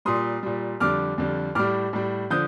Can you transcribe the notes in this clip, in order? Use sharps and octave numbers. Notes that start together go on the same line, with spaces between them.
A#2 G3 C6 D#6
A#2 G3
F2 D3 G3 D6 F6
F2 D3 G3
A2 G3 D6 F6
A2 G3
D3 F3 D#6 G6